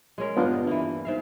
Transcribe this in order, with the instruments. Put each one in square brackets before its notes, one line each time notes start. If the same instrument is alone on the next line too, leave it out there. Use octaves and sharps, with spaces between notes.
[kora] G#3 C#4 A#4
[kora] G2 D3 D#4 [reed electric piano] B3 D4 F4
[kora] E3 A#3
G#2 E5 F5